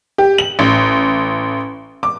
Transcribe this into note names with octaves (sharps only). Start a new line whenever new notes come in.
G4
F#7
A1
D6